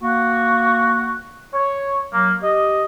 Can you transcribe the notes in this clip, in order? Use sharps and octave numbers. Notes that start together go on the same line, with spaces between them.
A#3 F#4
C#5
F#3 A#3
G4 D#5